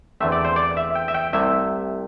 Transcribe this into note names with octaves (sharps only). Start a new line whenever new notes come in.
E2 D3 A3 C4 E5
D5
C5
D5
E5
G5
E5
G5
C2 C3 A3 E4 E5